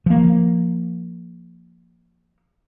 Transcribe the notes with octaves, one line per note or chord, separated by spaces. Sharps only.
F3 A#3